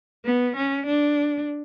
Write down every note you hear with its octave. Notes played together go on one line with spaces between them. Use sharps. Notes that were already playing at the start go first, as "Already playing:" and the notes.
B3
C#4
D4